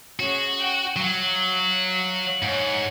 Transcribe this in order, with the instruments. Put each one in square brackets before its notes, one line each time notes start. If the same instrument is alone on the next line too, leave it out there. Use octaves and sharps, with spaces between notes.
[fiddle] C#4 G#4 [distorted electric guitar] F#4
[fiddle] G5
[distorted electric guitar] F#3 [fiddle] F5 F#5
[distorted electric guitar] G#2 [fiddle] C#5 F#5